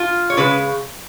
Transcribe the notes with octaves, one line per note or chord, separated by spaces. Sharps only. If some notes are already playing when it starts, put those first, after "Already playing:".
Already playing: F4
C#5
C#3 G#3 B4